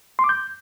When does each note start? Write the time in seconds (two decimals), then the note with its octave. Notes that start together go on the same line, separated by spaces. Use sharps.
0.19 C6
0.24 D6
0.29 G6